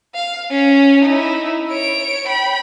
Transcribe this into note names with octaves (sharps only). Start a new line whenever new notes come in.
F5
C#4
D#4 E4
C#5 D7
G5 B5